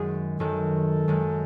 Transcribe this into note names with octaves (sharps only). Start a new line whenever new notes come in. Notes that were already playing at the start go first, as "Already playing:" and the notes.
Already playing: F#2 D#3 G#3 G#4
F#2 D#3 G#3 A4
F#2 D#3 G#3